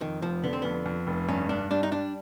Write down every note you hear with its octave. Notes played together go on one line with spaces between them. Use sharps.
F2 D#3
F1 F3
D3 B3
C4
F2 B3
F2
F1
G2 C#4
G2 D4
G3 D4
D#4
G3 D4